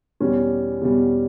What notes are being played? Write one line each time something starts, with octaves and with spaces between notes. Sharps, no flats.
E2 B2 G3 C#4
E2 B2 G3